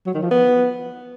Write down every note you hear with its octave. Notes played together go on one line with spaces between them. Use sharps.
F#3
D#3
F3
B3